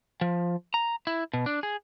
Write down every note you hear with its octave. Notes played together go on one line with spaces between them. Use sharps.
F3
A#5
E4
B2
D4
G#4